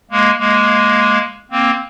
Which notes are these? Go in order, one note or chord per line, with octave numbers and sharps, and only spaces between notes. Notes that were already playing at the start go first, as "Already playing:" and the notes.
G#3 A#3
G#3 A#3
A#3 C4